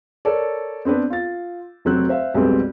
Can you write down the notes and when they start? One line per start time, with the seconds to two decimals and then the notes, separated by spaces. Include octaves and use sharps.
0.25 A4 A#4 C#5 D5
0.85 B3 C4 D4 B4
1.10 F4 A6
1.85 F1 F#3 C4 F#6
2.09 C5 E5 F5
2.34 B1 F2 G3 G#3 C4 B4